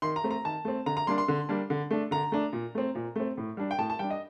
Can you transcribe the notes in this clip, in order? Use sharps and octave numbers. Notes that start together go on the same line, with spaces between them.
D#3 C6
A#5
A3 C4
A#5
D#3 A5
A3 C4
D3 A#5
A#5
G3 A#3 D4 C6
C6
D3
G3 A#3 D4
D3
A3 D4
D3 A#5
A3 D4
A#2
A3 C4
A#2
A3 C4
A2
G3 D4
G5
A2 A5
A5
G3 D4 G5
D#5